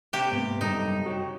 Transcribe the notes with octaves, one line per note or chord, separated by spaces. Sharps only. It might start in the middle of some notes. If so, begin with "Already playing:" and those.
C3 G4
G#2 A#3 B3
F#2 G3 D#4 A4
F#4 C#5 G5